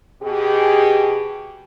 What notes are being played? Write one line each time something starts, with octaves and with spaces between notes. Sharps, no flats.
B2 G4 G#4